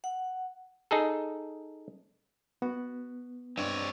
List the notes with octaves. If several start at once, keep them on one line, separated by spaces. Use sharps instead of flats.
F#5
D#4 G#4 A4
B3 F#4
G2 C4 C#5 D5